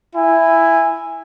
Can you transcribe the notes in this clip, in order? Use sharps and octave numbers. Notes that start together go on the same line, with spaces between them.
E4 G#5